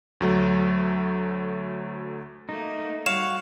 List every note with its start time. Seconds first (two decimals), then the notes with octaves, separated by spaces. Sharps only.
0.21 D2 F#3 A3
2.49 A3 A#3 D#4
3.06 G3 F#4 C#5 F5 E7